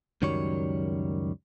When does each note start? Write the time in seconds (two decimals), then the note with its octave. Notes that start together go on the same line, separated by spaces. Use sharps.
0.22 C#2 F#2 D#3 F#3 G3 C#5